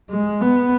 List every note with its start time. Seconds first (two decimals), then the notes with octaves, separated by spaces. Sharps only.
0.11 G#3
0.41 B3